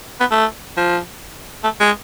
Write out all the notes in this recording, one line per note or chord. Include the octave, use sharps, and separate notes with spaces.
B3
A3
F3
A3
G#3